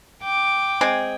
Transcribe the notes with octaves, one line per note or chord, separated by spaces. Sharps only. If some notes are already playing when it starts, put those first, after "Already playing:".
G5 D6
G#3 C4 G#4